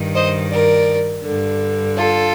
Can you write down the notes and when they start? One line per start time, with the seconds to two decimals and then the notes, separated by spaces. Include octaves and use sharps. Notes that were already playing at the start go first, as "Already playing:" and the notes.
Already playing: G2 D#3
0.15 C5 D#5
0.51 A#4 D5
1.24 G2 D3
1.95 F4 A4